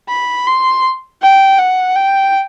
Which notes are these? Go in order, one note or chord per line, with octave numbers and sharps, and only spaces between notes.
B5
C6
G5
F#5
G5